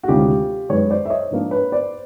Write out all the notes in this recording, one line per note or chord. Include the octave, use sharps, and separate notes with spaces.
F#4
D2 C3 D#3 G#3 C#4 F4 G4
F#2 D#3 G#3 B4 C#5
C5 D5
E5
C#5 D#5
G#2 F3 A#3 D4
B4 C#5
C5 D5